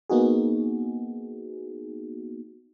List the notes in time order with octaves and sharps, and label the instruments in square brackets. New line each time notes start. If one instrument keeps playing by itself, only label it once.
[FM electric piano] A#3 B3 D#4 F#4 G#4